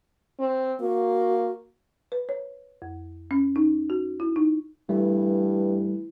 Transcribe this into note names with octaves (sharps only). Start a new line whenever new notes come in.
C4
A#3 F#4
B4
C#5
F2
C#4
D#4
F#4
E4
D#4
G2 E3 G3 A3